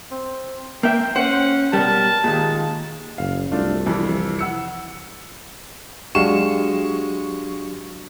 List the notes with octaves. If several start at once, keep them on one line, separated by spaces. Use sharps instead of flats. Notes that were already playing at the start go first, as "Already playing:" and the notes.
C4
A#3 E5 G5
C#4 C5 F#5
B2 G3 A#4 A5
D#2 A#2 G#3
F#1 F5
C2 A3 D4 F4
F2 E3
F#5 E6 C#7
F#3 G#3 D4 F#4 G4 F5 C#6 E7